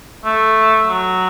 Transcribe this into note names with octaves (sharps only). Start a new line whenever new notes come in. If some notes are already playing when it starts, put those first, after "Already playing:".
A3
F#3